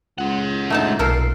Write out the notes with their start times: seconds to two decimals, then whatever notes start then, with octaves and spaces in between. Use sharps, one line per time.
0.18 C#2 G#3 F#5
0.70 A3 D#4 A5
0.99 B1 A#2 A4 A#4 C7